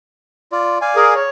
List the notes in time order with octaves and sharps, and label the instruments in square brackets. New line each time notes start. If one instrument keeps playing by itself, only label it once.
[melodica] F4 D5
D5 F5 G#5
[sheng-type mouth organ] G#4 A#4
C#5